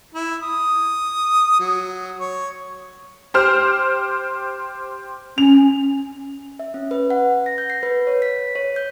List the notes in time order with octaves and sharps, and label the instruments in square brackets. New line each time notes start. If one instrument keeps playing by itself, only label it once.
[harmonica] E4
D#6
F#3
C#5
[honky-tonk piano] G4 C5 F6
[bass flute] C#4 [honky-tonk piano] F7
[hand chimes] E5
C#4
B4
F#5
A#6
G6
C7
B4
C#5
B6
C#5
G6